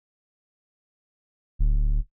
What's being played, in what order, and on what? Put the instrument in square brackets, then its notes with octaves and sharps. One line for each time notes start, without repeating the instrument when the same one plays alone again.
[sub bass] D1